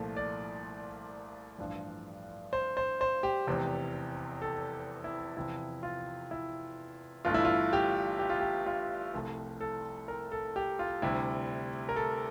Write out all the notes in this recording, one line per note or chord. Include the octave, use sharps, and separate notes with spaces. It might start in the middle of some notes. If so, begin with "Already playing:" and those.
Already playing: C2 A#2 F3 A3
D5
A1 G2 F3
C5
C5
C5
G4
F1 E2 C3
A4
E4
E2 C3 F3 E4
F4
E4
G1 G2 E3 A3 F4
E4
F4
G4
G4
F4
G4
F4
C2 C3 F3 A3
A4
A#4
A4
G4
F4
D2 C3 G3 E4
A#4
A4